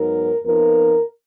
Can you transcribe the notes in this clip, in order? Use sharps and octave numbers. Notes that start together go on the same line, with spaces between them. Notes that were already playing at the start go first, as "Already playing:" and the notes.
Already playing: G#2 F#3 B3 D#4 A#4
F2 F3 B3 D#4 A#4